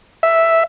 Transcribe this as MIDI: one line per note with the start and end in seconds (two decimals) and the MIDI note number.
0.23 0.63 76